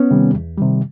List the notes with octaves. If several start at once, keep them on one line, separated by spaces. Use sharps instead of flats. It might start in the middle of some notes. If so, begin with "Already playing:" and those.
Already playing: B3 C#4
C3 D#3 G3
E2
C3 D#3 G3